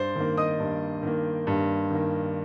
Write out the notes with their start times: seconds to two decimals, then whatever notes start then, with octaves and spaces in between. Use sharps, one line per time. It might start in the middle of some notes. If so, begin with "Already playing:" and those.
Already playing: G2 C5 D5 C6
0.16 D#3 A#3
0.37 D#5 D#6
0.59 G2
1.03 D#3 A#3
1.47 G2
1.90 D#3 A#3